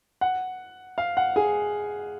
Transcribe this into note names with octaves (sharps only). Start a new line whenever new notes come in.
F#5
F5
F#5
G#4 G#5